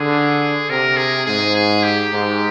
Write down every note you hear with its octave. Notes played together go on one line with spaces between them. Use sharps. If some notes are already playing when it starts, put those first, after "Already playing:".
Already playing: D3 G#4
C3 A#4
G#4
G#2 G#4
G#4
G4
G#2